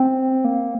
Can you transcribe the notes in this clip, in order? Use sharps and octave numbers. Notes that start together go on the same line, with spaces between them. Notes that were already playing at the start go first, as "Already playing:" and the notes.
Already playing: C4
A#3